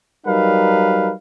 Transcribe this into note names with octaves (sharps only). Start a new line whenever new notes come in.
F#3 G3 D#4 A#4 B4 F5